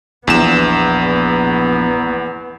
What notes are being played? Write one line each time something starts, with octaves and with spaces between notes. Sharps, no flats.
A#1 E2 B3 E7